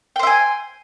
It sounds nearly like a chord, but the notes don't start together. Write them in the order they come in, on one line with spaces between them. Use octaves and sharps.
G5 C5 E5 G#5